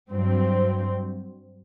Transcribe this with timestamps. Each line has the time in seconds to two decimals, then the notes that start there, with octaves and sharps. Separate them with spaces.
0.12 G2 F#3 C4